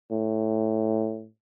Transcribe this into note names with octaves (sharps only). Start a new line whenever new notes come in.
A2